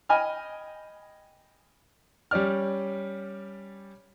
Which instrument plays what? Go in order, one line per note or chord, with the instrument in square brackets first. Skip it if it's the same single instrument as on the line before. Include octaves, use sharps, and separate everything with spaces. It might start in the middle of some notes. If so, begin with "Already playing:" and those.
[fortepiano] D#5 G5 G#5 B5 F6
[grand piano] G3 C#4 D5 F6